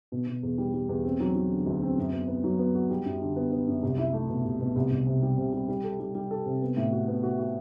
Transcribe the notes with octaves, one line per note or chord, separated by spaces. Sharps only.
B2
B2
E2
G3
G3
E2
C4
F#3
F#3
D3
D2
C4
F#2
B3
B3
F#3
B3
F#4
G3
F#2
D3
B3
B3
F#2
C2
E4
A3
B2
C2
B2
C2
C2
C3
G3
C3
G3
G3
A4
G3
G3
A4
C3
B3
A2
F#4
B3
F#4
F#4